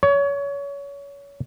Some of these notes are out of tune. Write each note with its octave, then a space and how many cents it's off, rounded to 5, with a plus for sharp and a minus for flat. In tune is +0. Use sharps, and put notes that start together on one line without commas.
C#5 +25